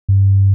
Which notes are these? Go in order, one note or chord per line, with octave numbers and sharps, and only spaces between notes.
G2